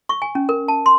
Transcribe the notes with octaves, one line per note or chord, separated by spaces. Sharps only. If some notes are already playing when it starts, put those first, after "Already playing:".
C#6
G#5
C#4
A#4
A5
C6